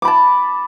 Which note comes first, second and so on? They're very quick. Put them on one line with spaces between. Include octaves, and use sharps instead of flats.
D6 B5 A5